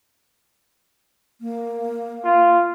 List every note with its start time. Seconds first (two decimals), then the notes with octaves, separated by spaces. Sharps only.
1.41 A#3
2.24 F4